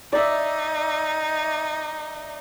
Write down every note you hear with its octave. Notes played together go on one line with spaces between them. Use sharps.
D#4 D5 E5